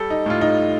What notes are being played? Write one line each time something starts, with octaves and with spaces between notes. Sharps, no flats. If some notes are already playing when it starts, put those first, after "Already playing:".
Already playing: G3 A4
D#4
A2 F4
D#4